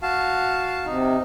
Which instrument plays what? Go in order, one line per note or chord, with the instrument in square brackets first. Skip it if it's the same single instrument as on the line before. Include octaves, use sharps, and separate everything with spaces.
[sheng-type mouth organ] F#4 F5 A5
[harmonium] C3 [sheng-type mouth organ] D#4